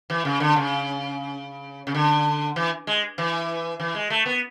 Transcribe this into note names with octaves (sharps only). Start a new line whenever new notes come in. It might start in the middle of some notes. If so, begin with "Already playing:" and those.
E3
C#3
D3
C#3
C#3
D3
E3
G#3
E3
E3
G#3
A3
B3